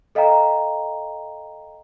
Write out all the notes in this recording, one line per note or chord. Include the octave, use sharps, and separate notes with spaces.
A4 D#5 F5 G5 A#5